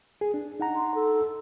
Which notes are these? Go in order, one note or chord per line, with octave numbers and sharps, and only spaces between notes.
G#4
D4
D#4 F#5 A#5
C6
A4